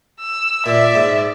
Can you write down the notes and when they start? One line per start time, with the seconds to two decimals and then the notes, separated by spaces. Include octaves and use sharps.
0.20 E6
0.66 A#2 D5 E5
0.95 G#2